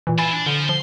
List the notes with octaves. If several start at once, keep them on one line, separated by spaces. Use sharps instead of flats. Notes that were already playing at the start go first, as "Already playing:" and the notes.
A#2 E3
E4 F4 G#5 B5 A6
D4
D3 F3
F3 C6